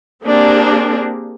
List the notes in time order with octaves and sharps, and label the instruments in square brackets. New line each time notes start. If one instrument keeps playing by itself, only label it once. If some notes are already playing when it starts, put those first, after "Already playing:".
[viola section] A#3 C4 D4 G4 G#4 A#4